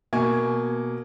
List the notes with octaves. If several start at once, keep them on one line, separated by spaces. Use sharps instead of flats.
B2 A#3 G#5 C#6 G#6